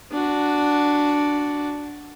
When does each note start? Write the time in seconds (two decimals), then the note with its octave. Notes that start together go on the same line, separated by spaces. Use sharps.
0.12 D4 F#4